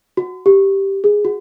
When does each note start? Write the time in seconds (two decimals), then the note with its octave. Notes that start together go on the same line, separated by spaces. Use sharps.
0.17 F#4
0.46 G4
1.04 G#4
1.25 F#4